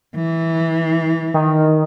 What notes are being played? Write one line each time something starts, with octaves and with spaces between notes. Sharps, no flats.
E3
D#3